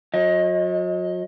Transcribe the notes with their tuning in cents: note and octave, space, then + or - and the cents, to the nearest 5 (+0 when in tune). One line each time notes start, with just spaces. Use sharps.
F#3 -40 D#5 +15